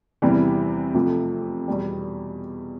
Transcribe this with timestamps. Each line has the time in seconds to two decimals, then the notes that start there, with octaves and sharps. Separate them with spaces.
0.22 E2 C3 E3 G3
0.94 F2 C3 F3 A3
1.68 E2 B2 G3